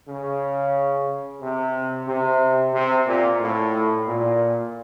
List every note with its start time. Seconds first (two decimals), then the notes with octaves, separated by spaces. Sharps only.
0.08 C#3
1.41 C3
2.08 C3
2.74 C3
3.07 A#2
3.41 A2
4.07 A#2